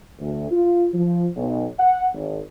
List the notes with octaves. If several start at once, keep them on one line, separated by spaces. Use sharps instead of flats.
D2
F4
F3
B1
F#5
G#1